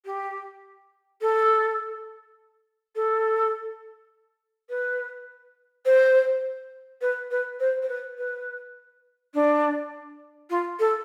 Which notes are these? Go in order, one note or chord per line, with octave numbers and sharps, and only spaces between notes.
G4
A4
A4
B4
C5
B4
B4
C5
C5
B4
B4
D4
F4
A4